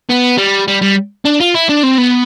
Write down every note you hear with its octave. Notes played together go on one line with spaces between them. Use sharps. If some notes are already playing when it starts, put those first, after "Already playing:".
B3
G3
G3
G3
D4
F4
E4
D4
C4
B3